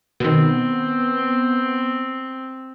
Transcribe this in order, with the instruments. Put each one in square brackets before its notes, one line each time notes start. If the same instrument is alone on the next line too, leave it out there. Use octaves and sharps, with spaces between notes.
[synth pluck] B2 D#3 [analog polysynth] B3 [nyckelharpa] C4